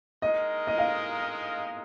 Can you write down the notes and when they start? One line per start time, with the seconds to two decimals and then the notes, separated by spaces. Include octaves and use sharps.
0.22 G#3 D#4 A#4 D#5
0.67 D#5
0.78 F5